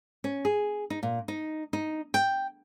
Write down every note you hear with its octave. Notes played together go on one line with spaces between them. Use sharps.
C#4
G#4
D#4
A#2
D#4
D#4
G5